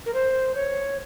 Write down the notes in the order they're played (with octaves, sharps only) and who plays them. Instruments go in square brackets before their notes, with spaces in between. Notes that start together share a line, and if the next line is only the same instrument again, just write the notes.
[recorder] A#4
C5
C#5